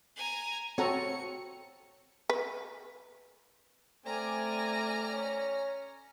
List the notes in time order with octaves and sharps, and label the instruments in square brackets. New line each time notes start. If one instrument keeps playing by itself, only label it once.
[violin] G#5 A#5
[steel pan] C4 A4 A#5 [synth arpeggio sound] F#4 C#5 [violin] C#7
[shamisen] B4
[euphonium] A3 [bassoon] C4 [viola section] D5 G#5 [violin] A#5 F6
[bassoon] C#4